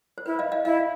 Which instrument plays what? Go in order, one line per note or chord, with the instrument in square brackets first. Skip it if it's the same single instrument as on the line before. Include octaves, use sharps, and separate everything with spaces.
[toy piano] C5
[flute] E4 [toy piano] B4
[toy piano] D#5 F5
D#5 F5
[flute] E4 [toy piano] D#5 F5